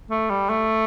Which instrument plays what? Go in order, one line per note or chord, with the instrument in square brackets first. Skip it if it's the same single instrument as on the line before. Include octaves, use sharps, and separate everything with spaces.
[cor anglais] A3
G3
A3